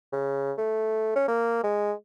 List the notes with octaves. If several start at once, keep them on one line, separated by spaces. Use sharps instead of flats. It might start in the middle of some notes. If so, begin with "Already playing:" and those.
C#3
A3
C#4
A#3
G#3